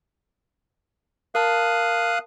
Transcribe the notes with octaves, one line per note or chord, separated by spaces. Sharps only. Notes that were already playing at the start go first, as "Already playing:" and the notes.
A#4 F5 A5 D#6 F#6